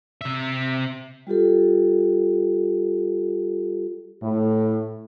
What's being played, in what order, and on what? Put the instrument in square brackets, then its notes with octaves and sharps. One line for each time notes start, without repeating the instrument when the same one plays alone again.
[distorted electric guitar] C3 E5
[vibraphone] G3 F4 G4 A4
[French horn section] A2